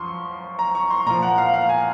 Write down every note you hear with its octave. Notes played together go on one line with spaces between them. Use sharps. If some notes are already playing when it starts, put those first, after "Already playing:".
Already playing: F#2 F3 C6 C#6
A#5
C#6
C6
A#2 F3 A#5
F#5
F5
F5
G#5